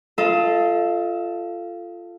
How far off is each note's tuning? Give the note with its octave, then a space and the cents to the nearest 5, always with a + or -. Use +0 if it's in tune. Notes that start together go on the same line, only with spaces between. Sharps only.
F4 -10 A4 +0 D#5 +35